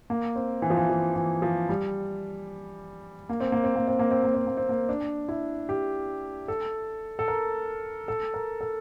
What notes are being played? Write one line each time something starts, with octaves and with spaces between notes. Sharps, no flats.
A#3
C4
E3
F3
E3
F3
E3
F3
G3
A#3
C4
A#3
C4
A#3
C4
A#3
C4
A#3
C4
A#3
C4
A#3
D4
E4
G4
A4
A4
A#4
A4
A#4
A4